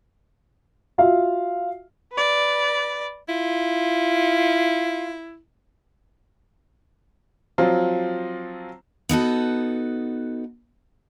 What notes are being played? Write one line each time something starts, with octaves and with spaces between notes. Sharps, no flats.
F4 F#4 E5 F5
B4 D5
E4 F4
F3 F#3 C4 F4
B3 D#4 F#4 A4